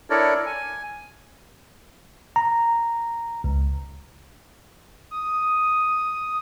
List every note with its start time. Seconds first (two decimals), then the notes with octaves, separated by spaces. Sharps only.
0.10 D4 E4 A4 A#4 C#5 D5
0.46 G#5
2.36 A#5
3.44 C#2
5.11 D#6